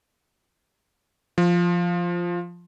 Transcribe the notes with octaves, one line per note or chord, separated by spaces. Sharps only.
F3